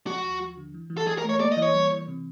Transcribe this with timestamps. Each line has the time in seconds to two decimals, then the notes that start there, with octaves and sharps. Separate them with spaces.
0.07 F3 F#4
0.24 D#2
0.40 F3
0.57 D3
0.74 E3
0.90 E3
0.97 A4
1.07 E3 G#4
1.18 A#4
1.24 A3
1.29 C#5
1.40 A#3 D5
1.52 D#5
1.57 E3
1.62 C#5
1.74 G3
1.91 E3
2.08 C3